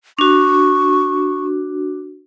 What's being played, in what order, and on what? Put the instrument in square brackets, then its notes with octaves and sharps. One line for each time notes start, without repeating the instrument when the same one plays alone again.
[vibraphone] D4 F#4 [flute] C#6